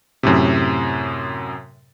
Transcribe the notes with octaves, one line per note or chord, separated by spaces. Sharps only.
F#2 A2 C3